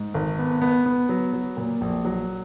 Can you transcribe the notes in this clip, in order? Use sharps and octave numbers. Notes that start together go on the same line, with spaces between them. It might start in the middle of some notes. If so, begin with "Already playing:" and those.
Already playing: G#2
G#1
B3
B3
B3
F#3
F#3
A#2
A#1
F#3